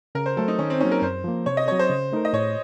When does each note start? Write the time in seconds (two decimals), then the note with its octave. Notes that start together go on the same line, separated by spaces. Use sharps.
0.15 C#3 A#4
0.26 C5
0.37 F#3 A3 A4
0.48 D#4
0.59 D#3 C#4
0.70 C4
0.80 F#3 A#3 C#4 D#4
0.91 A#4
1.02 F#2 C5
1.24 F3 A#3
1.46 C3 C#5
1.57 D#5
1.68 F#3 C4 C#5
1.79 C5
1.90 C#3
2.12 A3 D#4 A#4
2.25 D#5
2.33 A2 C#5